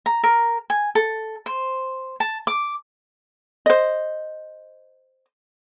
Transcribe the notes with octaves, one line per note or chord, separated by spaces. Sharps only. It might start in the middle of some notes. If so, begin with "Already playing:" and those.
A#5
A#4
G#5
A4
C5
A5
D6
C5 D#5